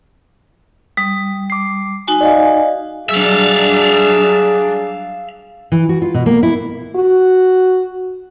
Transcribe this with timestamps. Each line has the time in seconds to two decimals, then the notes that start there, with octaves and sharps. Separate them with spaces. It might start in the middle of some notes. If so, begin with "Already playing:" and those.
0.97 G3 D#6
1.50 D6 C7
2.07 D#4 F#4 G#5
2.21 D5 D#5 F5
3.09 F#3 G3 D4 G#4 E5 F5
5.72 E3
5.89 F#4
6.02 F4
6.14 B2
6.26 A#3
6.43 E4
6.96 F#4